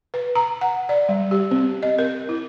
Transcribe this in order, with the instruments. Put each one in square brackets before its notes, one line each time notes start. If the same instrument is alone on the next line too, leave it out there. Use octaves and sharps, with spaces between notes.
[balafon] B4
A#5
F#5
D5
G3
G4
C4
D#5
A#4
E4